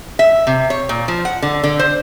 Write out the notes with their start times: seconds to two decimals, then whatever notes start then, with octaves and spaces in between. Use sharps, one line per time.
0.19 E5
0.47 C3
0.70 C#5
0.89 A#2
1.08 F3
1.25 F#5
1.42 D3
1.64 D3
1.79 C5